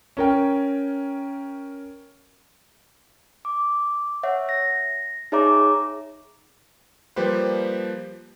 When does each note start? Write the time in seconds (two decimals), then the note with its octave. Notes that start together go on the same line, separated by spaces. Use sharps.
0.17 C#4 A#4 G5
3.45 D6
4.23 C#5 E5 F#5
4.49 A#6
5.32 D#4 G#4 C#5 E5 A#5 D6
7.16 F3 G3 A#3 G4 B4 C5